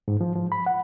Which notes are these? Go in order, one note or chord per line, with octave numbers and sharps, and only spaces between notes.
G#2
F3
F3
B5
F#5